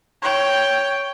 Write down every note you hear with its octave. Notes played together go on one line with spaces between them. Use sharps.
C#5 G5